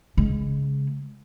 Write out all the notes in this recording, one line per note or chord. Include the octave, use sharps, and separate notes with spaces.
C#3 G#3